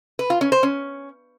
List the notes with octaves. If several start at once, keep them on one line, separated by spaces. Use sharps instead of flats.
B4
F4
C#4
C5
C#4